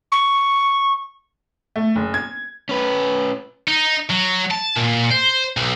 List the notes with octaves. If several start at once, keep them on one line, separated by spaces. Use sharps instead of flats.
C#6
A3
F#1
G#6
C#4 B4
D#4
F#3
A5
A#2
C5
B1